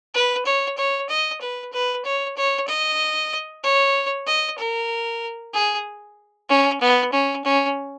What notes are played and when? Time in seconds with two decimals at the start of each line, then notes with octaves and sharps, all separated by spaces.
0.14 B4
0.46 C#5
0.78 C#5
1.09 D#5
1.41 B4
1.73 B4
2.05 C#5
2.37 C#5
2.68 D#5
3.63 C#5
4.27 D#5
4.58 A#4
5.54 G#4
6.49 C#4
6.81 B3
7.13 C#4
7.45 C#4